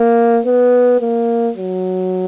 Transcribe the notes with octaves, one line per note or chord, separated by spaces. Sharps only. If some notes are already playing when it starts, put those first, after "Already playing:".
Already playing: A#3
B3
A#3
F#3